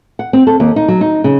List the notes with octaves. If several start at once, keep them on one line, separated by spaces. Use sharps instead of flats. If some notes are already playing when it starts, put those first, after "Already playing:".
F#5
C4
A4
D#2
D#4
F#3
D#4
C#3